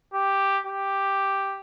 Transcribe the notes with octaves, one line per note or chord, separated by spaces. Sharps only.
G4
G4